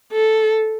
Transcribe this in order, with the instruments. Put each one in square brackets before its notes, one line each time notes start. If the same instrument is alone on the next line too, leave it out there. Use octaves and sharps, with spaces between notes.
[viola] A4